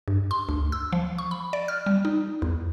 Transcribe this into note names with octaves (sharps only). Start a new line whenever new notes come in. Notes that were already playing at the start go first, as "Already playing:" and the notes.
G2
C6
D2
E6
F3
C#6
B5
D5
F6
G3
D#4
E2